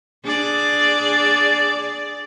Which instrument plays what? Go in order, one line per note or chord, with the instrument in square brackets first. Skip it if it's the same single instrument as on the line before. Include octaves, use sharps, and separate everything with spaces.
[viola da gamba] D4 G#4 D5